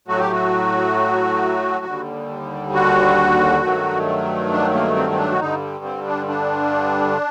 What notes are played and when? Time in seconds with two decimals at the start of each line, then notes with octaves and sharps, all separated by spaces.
0.08 A2 F#3 A3 F#4
0.19 G4
0.32 F#4
1.85 D#2 D3 G3
2.74 F#4
3.63 G2 D#3 F#3 A3
4.51 D4
4.73 A#3
4.96 C4
5.11 C4
5.18 D4
5.31 F#4
5.40 G2 D3 G3 D#4
5.84 C4
6.07 D4
6.29 D4